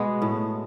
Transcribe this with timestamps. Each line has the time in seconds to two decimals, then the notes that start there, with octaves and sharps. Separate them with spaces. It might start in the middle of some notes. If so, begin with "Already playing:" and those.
Already playing: B2 G#3 B3 F#4
0.22 A2